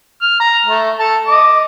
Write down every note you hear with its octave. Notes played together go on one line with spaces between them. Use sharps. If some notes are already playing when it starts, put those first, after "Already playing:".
F6
A#5
A3
A4 A5
D#5 D6